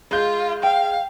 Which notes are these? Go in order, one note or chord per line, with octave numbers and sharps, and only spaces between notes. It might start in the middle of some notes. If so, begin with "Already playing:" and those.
G#3 F4 G6
F5 G5